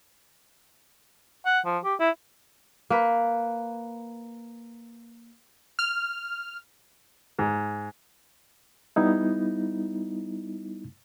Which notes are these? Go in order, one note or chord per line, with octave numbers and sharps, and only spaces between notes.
F#5
F3
G4
E4
A#3 B4
F6
G#2
G3 B3 D#4 E4